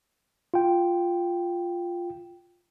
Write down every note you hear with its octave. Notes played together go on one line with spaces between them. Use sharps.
F4 G5